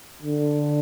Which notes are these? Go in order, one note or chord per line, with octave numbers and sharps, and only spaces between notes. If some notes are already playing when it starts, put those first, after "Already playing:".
D3